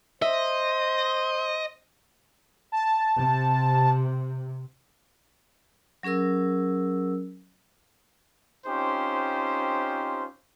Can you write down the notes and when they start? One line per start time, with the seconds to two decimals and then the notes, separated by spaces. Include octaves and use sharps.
0.22 C5 D#5 E5
2.72 A5
3.20 C3
6.03 F#3 C#4 G#4 A#4 E6
8.67 C4 C#4 D#4 F4 G4 C5